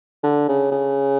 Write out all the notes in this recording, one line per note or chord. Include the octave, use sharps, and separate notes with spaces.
D3
C#3
C#3